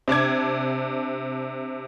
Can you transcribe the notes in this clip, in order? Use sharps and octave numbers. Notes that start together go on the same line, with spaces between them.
C3 D4 D6 G#6